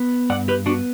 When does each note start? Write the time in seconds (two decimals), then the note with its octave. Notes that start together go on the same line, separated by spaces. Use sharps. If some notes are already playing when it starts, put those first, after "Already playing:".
Already playing: B3
0.30 G2 D5 F#5
0.48 G4 B4
0.66 B3 D4 F#4